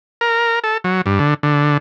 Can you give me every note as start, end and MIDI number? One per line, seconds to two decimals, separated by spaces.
0.21 0.59 70
0.64 0.78 69
0.84 1.01 54
1.06 1.19 43
1.19 1.34 50
1.43 1.77 50